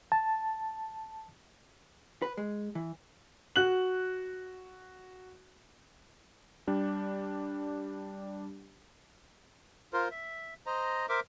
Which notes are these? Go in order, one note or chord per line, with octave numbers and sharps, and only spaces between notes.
A5
B4
G#3
E3
F#4 F#6 F#7
G3 D4 G4
F4 A#4 C5
E5
C5 D#5 A#5
A#4 C5 E5 D6